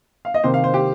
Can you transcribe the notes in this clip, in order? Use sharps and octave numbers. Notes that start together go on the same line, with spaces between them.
F5
D#5
C3 D#3 A#3 C5
F5
C5
G4